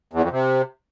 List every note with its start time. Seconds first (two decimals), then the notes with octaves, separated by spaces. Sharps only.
0.13 E2
0.22 F2
0.31 C3